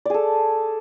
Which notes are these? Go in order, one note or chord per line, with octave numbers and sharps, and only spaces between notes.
G#4 A4 D5